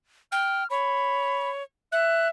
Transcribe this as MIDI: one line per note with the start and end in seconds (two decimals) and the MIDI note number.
0.32 0.64 79
0.32 0.69 89
0.70 1.63 73
0.70 1.50 83
1.92 2.29 76
1.92 2.28 90